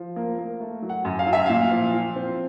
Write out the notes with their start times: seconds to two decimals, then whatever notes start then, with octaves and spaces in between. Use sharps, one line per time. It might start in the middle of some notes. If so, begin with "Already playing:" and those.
Already playing: F3
0.16 A#3
0.38 A#3
0.60 A3
0.82 F#3
0.89 F#5
1.05 F#2
1.19 F5
1.27 F#3
1.33 E5
1.46 A#2 F5
1.71 F3
1.94 F3
2.16 C4